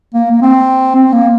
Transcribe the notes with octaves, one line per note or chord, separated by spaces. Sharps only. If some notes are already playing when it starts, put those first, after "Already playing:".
A#3
A#3
C4
C4
A#3